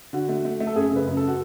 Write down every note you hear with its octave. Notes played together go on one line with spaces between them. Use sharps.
D3 F#4
A3
A3
A3
A4
F#2 G#4
C#3 B4
F#2
A4
F#4